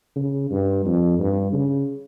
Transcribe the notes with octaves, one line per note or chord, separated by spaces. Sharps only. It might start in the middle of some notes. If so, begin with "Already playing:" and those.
C#3
G2
F2
G2
C#3